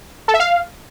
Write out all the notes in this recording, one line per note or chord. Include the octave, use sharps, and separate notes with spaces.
A4
E5
F5